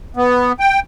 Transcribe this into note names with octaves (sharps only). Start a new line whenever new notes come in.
B3
G5